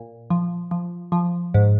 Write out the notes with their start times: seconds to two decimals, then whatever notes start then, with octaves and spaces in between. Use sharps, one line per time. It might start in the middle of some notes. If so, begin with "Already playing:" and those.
Already playing: A#2
0.30 F3
0.71 F3
1.12 F3
1.54 G#2